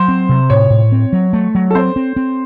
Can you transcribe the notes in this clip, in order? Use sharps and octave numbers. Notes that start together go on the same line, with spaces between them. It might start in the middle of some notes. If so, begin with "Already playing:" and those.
Already playing: F#3 C5
C4
C3
A2 C#5
A2
C4
F#3
A3
F#3
A4
C4 C5
C4
C4